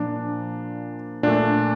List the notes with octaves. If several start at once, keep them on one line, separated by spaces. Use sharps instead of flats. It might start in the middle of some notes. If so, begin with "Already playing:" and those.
Already playing: A#2 F3 A#3 D4
A#2 A3 D4